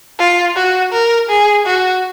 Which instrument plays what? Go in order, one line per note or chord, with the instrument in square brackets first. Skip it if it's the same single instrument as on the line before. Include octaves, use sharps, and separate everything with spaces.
[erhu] F4
F#4
A#4
G#4
F#4